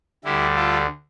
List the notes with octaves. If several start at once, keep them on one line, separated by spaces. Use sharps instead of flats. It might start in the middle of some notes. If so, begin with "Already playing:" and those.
D2 D3 G3 E4 G4
F4 A4